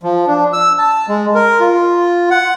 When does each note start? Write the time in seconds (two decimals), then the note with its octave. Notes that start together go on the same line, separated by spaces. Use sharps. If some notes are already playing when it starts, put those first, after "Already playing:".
0.03 F3
0.27 D4
0.53 E6
0.78 A5
1.08 G#3
1.35 A#4
1.60 F4
2.30 F#5